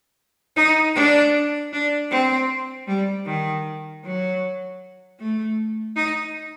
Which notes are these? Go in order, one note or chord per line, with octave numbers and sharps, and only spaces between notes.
D#4
D4
D4
C4
G3
D#3
F#3
A3
D#4